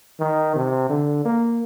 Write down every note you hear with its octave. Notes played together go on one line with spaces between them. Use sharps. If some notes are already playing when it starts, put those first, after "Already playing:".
D#3
C3
D3
A#3